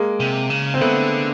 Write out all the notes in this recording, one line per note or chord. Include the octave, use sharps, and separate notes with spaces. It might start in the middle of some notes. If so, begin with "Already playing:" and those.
Already playing: G#3 A#3
C3
C#3
C4
D3 A3 B3